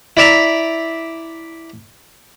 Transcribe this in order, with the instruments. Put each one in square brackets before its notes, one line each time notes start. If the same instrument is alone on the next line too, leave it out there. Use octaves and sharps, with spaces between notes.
[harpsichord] E4 D5 E5 A#5